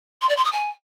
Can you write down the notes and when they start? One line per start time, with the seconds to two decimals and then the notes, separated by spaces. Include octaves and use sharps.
0.21 C6
0.29 D5
0.36 C6
0.44 D#6
0.52 G#5